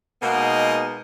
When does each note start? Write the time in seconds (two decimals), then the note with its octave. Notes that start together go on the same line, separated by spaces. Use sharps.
0.22 B2 G#3 A#3 B3 D#4